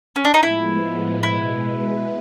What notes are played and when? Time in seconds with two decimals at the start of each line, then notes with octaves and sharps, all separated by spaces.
0.16 C#4
0.25 D4
0.34 D#4
0.42 A2 F3 G#3 B3 E4
1.23 B2 G#3 B3 E4